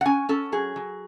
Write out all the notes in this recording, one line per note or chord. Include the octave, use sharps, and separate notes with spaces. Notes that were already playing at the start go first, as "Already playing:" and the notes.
F#5
C#4 G#5
C#4 A4
F#3 G#4
F#3